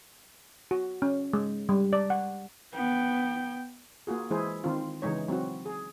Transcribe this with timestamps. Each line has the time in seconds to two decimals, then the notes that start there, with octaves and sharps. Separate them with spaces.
0.71 F#4
1.02 C#4
1.33 G#3
1.69 G3
1.93 D5
2.10 F#5
2.74 B3 G5
4.07 A#3 F4 F#4 G#4
4.31 E3 G#3 E4 G#4 C5
4.64 D#3 C4 D4 F4
5.02 C#3 E3 G#3 D#4 C#5
5.28 F#3 C4 E4 F#4
5.66 G#4